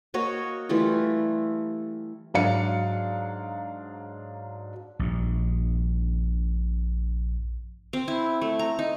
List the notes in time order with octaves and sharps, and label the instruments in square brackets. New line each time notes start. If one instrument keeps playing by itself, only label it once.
[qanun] A#3 F#4 C#5 D#5
E3 G3 A3 F4
[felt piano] G#2 F#3 D4 D5 F5 C#7
[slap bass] A#1 G2
[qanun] C4
E4
A3
A#5
D#4